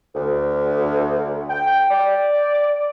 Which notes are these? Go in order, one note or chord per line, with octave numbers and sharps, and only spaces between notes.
D2
G5
D5